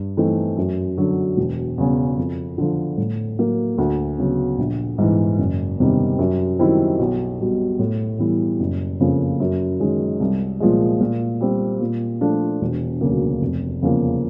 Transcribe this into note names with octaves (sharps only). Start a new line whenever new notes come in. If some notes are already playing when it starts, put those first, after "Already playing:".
Already playing: G2
E3 A3 C4 D#4
F#2
D3 F#3
E1
E2 C#3
F2
D3 F3
A2
F#3 A#3
D2
C#3 F#3 B3
A#1
G#2 E3
F#1
E2 C3 D#3 G3
F#2
D#3 G3 C4 E4
B1
B2 G3
A2
E3 G3 B3 E4
F#1
F2 C#3 F3 A#3
F#2
D#3 G#3 C#4
C2
A#2 F3 G#3
A#2
G3 C4
A#2
F3 A3 D4 F4
E1
D2 C#3 F#3 A#3
F1
E2 C#3 F3 A#3